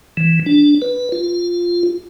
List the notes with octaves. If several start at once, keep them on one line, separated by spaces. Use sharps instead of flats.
E3
D4
B4
F4